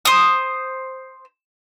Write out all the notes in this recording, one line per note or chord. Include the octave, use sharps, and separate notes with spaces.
C5 D#6